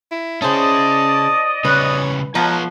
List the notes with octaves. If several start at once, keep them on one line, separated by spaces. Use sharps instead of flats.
E4
C#4 E4 G#4 C5 D5 D#5 A5
C#3 G3 B4 C#5
F3 G#3 B3 B4 C#5 A#5